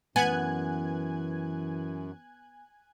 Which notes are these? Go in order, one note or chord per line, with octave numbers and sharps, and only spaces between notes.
F#2 E3 B3 G#5 F#6 G#6